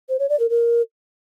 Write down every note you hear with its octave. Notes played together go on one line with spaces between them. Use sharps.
C5
C#5
D5
A#4
A#4